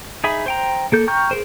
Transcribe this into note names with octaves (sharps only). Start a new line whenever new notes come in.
D#4 G#4 E5 B5
C5 G5 A#5
A#3 A4 G6
G5 A#5 C#6 F6 G6
G#4 A#4 C5